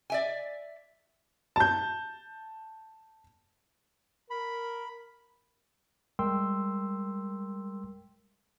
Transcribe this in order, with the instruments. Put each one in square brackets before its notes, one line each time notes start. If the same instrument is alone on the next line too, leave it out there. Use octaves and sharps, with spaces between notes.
[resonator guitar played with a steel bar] D5 E5 G#5
[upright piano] A5 G6
[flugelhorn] A#4 [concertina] B5
[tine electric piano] G3 G#3 A#4 G5 C6 E6